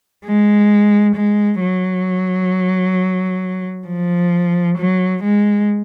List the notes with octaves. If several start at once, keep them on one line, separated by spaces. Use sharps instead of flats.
G#3
G#3
F#3
F3
F#3
G#3